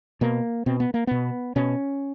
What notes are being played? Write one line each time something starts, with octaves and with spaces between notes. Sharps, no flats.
B2 A#3
B2 C4
B3
A#3
B2 B3
B2 C#4